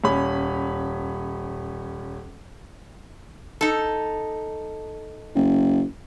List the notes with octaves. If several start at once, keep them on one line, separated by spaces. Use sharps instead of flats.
D#1 C#4 B5
D#4 A4
F#1